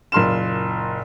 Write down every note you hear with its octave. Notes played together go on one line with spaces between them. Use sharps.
F#1 A#2 C6 F6 E7